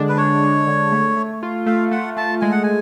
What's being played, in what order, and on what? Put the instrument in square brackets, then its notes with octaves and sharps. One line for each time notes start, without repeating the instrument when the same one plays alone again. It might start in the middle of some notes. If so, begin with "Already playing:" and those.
Already playing: [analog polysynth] D3 G#3 D4
[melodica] B4
[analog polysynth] D4 [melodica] C#5
[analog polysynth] G#3
D3
A3
A3
F4
[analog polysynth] A3 [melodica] F5
[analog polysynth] A3 [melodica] F#5
[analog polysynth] A3 [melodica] A5
[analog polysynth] G#3 [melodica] G#5
[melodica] F#5
G#5